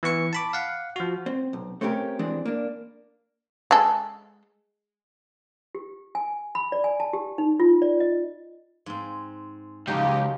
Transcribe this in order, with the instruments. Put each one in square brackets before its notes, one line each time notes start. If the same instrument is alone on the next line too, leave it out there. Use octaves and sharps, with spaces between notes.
[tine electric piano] E3 B3 C#6 C#7
A5 B5 D6
F5 F#5
F3 F#4
[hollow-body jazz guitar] C4
B1
A3 C4 C#4 G4 A#4
E3 G#3 C4 D4
A#3 D4
[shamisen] G#3 A4
[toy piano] G4
G#5
B5
D5
G#5
A5
G4
D#4
F4
D5
D#5
[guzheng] G#2 C4
[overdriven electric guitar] C#2 [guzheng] F#2 F3 F#3 [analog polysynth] C#3 D#4 G4